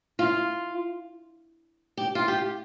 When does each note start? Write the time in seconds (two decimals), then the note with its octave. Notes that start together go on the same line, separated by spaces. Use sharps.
0.19 F4
1.97 G4
2.15 F4
2.28 G4